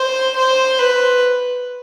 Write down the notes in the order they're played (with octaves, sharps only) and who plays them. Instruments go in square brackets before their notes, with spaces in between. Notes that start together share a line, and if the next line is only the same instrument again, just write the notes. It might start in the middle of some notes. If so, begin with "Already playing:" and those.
Already playing: [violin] C5
C5
B4